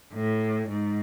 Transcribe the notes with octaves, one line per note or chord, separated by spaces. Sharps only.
A2
G#2